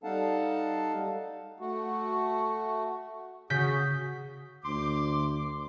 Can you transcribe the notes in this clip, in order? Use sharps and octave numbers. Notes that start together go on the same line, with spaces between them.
G3 D#4 A4 F5 F#5 A5
A3 F#4
C#3 F#4 G#4 G6 B6
D2 C6 D6